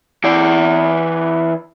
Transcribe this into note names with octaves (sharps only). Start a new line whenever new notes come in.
E3 D5